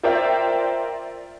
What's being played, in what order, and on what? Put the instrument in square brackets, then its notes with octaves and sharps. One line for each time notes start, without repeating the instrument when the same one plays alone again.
[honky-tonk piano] F4 A#4 C5 D5 E5 G5